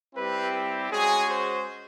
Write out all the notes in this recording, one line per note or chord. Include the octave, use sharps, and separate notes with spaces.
G3 C4 E4 G4 B4
G#3 C#4 F#4 G#4
C5